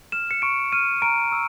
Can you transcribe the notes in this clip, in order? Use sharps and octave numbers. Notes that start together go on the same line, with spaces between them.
F6 E7
C#7
C#6 D7
F6 D#7
A#5 D7
C#6 E6